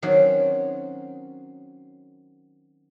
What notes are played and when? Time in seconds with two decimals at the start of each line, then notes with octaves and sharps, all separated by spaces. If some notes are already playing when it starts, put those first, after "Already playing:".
0.02 D#3 F#3 C4 C#4 F#4